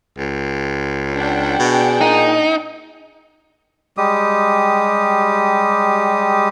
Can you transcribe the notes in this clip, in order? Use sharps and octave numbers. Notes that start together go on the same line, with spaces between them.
C#2
D4 F#5 G5
B2 G#4
A#2 D#4
G3 G#3 G4 D#6